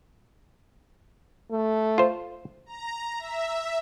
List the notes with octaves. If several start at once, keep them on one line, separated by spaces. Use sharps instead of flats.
A3
F4 C5
A#5
E5